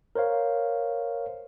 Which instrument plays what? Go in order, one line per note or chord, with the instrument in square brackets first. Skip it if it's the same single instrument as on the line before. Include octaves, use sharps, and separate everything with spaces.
[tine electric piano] A#4 C5 C#5 F5